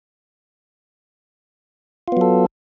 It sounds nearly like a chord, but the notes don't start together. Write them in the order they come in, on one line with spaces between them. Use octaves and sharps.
F4 B3 F#3 A4